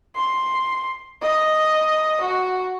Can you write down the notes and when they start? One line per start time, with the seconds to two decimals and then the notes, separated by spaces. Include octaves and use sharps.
0.15 C6
1.22 D#5
2.21 F#4